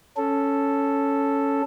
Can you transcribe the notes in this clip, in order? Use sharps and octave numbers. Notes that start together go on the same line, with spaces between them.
C#4 A4